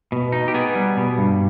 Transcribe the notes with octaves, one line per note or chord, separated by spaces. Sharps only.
B2
D#4
G4
B3 G#4
G3
B2
G2